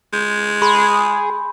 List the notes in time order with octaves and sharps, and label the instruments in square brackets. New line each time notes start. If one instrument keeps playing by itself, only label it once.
[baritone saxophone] G#3 [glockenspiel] G6
[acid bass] G#4 [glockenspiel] B5 C6